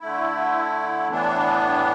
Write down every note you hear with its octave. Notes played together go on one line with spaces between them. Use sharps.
D3 A3 E4
A2 E3 B3 D4